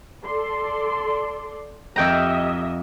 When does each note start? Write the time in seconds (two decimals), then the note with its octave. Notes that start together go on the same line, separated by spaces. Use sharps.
0.25 A4 D5 C6
1.96 F2 G4 D#5 E5 G5 A#5